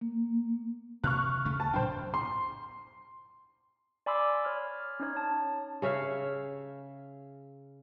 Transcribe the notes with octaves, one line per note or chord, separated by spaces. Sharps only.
A#3
C3 C#6 F6 F#6
D2 C#3 A3
A5
A2 F#3 D4 C5 G5
C6
D5 G#5 B5 C6 D6 E6
C#5 F6
C#4 D#4 C#5
A5
C#3 C#5 E5 F5